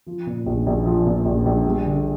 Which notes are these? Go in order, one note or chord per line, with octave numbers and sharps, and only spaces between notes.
F3
A#2
A#1
A#1
F3
A#2
A#1
A#1
G3
D3